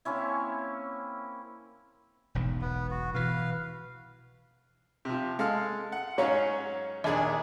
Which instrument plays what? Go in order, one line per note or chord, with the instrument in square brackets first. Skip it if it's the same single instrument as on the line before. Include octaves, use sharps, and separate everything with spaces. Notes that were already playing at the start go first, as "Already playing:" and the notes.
[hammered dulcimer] A#3 C4 C#4 E4
[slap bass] E1 B1 G#2
[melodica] B3
F#4
[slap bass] B2 E3 [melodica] B4 F5
[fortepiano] C3 F3
G#3 A4 F5 F6
F#5
G#2 F#3 C#4 C#5 F5 C#6
A#1 D#2 D4 G#4 D5